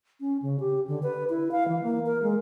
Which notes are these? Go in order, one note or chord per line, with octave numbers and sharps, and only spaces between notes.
C#4
C#3
G4
D3
B4
E4
F5
E3
A#3
A#4
G#3